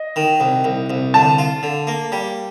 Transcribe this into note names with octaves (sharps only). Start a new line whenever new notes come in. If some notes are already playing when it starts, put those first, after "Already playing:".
Already playing: D#5
D#3
C2
C2
C2
D3 A5
F4
D3
A#3
G3